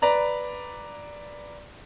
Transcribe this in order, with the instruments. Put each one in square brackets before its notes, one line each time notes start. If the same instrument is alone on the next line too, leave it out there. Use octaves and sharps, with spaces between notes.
[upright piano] B4 D5 A#5